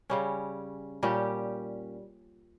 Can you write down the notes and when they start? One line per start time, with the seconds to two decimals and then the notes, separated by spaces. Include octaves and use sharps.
0.10 C#3 G3 C#4
1.03 A#2 G3 C#4 G4